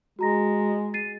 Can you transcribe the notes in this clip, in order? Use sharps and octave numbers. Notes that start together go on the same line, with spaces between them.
G#3 F#4 A#5 A#6
A6 C7 D#7